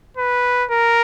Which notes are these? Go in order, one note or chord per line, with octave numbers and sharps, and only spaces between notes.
B4
A#4